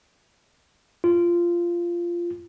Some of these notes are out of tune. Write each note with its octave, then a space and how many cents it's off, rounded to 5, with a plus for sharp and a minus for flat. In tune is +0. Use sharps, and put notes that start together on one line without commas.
F4 -15